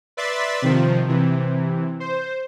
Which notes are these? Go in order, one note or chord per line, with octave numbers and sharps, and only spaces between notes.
B4 D5 E5 C6 A6 B6
C3 D#3 F3
C3 E3
C5